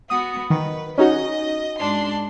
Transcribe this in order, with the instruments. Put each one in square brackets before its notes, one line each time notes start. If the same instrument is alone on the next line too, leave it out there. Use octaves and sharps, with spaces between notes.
[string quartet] B3 F#4 [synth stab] D#6
[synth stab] D#3 [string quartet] B4
[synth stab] C#4 D#4 F#4 [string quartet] D#5
[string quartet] G#2 D4 C6